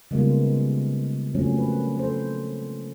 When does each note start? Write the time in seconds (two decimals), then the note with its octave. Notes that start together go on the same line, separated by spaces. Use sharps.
0.11 C#3 G3 G#3 A#3 B3 F4
1.35 C#3 F3 F#3 A3 C4 C#4
1.57 A#3 B4
1.97 A4 B4 C5